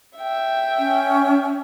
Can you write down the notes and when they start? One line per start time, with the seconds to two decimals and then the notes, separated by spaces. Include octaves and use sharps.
0.18 E5 G5
0.78 C#4